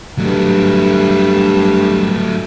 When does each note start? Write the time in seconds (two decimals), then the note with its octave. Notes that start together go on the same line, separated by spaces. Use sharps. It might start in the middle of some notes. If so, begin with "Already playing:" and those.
0.18 G2 F#3 A3